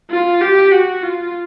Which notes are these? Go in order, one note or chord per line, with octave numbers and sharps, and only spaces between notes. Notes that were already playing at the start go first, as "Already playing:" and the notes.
F4
G4
F#4
F4